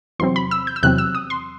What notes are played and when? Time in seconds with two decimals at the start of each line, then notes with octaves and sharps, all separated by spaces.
0.19 E2 C3 F#3 C4 C6
0.36 B5
0.51 E6
0.67 G6
0.76 E6
0.83 E2 C3 F#3 C4 F#6
0.98 E6
1.15 D#6
1.30 C6